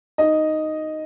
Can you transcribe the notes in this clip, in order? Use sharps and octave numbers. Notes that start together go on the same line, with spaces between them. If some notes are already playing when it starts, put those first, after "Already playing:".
D#4 D#5